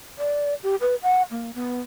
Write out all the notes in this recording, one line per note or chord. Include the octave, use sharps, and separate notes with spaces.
D5
G4
B4
F#5
A#3
B3